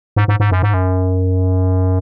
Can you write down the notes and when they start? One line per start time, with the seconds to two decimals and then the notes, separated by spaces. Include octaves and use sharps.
0.16 G#2
0.28 G#2
0.40 G#2
0.51 F#2
0.63 G#2
0.74 F#2